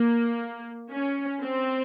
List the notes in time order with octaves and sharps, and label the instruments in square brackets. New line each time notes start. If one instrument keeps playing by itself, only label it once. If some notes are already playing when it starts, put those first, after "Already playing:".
Already playing: [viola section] A#3
C#4
C4